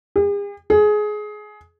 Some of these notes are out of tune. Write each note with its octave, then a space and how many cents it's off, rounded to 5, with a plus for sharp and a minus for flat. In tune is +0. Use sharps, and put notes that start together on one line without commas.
G#4 -45
G#4 +20